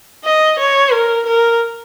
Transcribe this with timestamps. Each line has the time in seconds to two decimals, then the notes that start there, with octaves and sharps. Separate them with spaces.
0.25 D#5
0.59 C#5
0.92 A#4
1.26 A#4